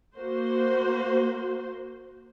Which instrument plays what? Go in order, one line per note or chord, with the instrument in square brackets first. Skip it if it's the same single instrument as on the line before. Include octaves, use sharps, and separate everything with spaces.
[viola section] A#3 F#4 C5